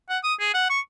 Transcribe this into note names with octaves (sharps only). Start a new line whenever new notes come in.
F#5
D#6
G#4
F#5
C#6